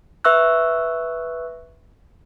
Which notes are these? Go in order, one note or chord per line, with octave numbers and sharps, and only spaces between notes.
B4 E5 C#6 E6 F#6